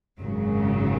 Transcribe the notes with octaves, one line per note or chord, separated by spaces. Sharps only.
G#1 F#2 C#3 F#3